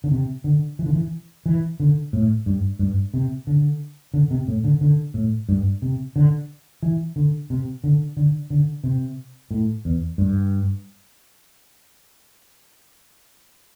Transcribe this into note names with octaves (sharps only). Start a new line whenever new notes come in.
D3
C3
D3
E3
D3
E3
E3
D3
A2
G2
G2
C3
D3
D3
C3
A2
D3
D3
A2
G2
C3
D3
E3
D3
C3
D3
D3
D3
C3
A2
E2
G2